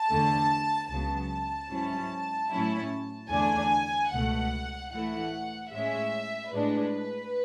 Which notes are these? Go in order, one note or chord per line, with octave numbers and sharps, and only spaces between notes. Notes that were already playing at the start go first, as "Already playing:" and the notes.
Already playing: A5
E2 D3 A3
C#2 C#3 F#3 B3 A5
G#2 F#3 C#4 E4
A2 F#3 C#4 E4
E2 D3 A3 D4 G#5
C#2 B2 A3 F#5
A2 E3 A3 E4 F#5
A2 G#3 C#4 E5
A2 G#3 D4 B4